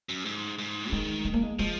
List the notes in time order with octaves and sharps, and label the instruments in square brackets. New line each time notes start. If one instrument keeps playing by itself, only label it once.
[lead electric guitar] F#2
G#2
G#2
[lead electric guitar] D#3 [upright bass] G#3
[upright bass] G#3
A#3
G#3
[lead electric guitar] F3 [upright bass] G#3